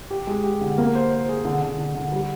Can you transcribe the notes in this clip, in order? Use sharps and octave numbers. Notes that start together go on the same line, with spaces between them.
G4
G#3
G4
D3
A#3
C5
C5
G#4
D3
D3
D3
D3
G3